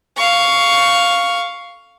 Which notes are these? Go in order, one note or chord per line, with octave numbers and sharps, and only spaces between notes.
F5 C#6